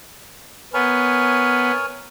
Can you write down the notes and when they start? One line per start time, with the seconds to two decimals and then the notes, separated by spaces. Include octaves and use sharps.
0.74 B3 A#4 C#5 G#5